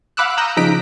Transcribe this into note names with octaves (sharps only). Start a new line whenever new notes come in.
F5 F#5 B5 D6 E6 F#6
A#5 D#6 E6 F#6 G6 A#6
C#3 F3 D#4 A#5 B6 D7